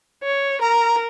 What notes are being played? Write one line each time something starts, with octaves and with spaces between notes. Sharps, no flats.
C#5
A#4 A#5